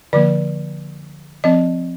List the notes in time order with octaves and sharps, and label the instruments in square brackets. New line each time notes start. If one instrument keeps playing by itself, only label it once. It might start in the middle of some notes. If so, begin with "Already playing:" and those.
[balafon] D3 F3 A#3 D5
F3 C4 D#5